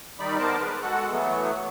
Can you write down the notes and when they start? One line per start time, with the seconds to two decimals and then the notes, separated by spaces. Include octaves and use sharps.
0.19 D#3 G3 D#4 D5 B5
0.39 B3 A#4 C5 A5 D6
0.60 G#3 B4
0.82 G#3 F#4 A4 F#5
1.12 E3 F#3 A3 B3